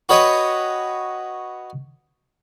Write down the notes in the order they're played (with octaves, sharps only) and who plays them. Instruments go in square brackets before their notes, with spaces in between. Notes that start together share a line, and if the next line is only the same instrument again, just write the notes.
[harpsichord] F#4 B4 C#5 D#5 G5